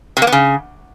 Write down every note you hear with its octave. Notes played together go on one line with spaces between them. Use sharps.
C3
A#3
B3
C#3